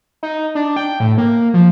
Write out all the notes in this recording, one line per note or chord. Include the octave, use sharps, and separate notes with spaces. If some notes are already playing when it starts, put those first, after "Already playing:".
D#4
D4
G5
A2
A#3
F3